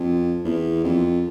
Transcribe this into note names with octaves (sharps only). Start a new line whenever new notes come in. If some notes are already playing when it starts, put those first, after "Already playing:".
Already playing: F2
E2
F2